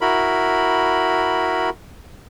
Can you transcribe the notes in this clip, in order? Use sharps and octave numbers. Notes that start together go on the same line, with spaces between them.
E4 F#4 A#4 B5